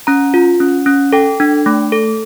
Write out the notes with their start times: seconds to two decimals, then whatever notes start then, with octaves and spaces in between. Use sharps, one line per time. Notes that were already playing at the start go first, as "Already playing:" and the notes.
0.07 C#4 A#5
0.34 F4
0.60 C#4
0.86 C#4
1.13 A4 G5
1.40 D4
1.66 A3
1.92 A4